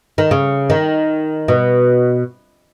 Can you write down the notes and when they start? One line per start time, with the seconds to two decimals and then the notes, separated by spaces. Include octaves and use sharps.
0.18 D#3
0.31 C#3
0.70 D#3
1.48 B2